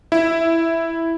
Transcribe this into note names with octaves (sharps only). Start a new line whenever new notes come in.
E4